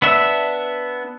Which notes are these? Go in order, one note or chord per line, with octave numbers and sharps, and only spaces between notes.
B3 D4 E5